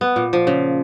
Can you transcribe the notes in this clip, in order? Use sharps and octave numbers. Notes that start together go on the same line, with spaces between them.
B3
A#2
F3
C#3